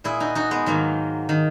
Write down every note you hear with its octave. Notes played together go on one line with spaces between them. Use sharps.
A#2 E4 G#4
D#4 F#4
D#4 F#4
G#3 B3
G#2 D#3 F#3 A#3
D#3